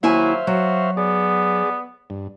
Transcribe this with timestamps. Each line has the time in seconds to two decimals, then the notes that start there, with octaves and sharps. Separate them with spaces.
0.03 D#2 F#3 E4 C5 E5 F5 G#5
0.47 F#3 F#4
0.97 B3 G#4 D5
2.10 G2